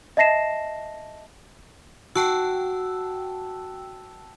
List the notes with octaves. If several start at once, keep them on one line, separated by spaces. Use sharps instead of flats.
D#5 E5 A5 A#6 C7 E7
F#4 G5 A5 E6